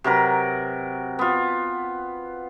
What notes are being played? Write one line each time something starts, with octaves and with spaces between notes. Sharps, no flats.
C3 F#3 A#4 B4
B3 F4